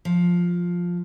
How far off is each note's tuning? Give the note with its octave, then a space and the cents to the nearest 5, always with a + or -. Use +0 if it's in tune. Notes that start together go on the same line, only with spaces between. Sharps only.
F3 +5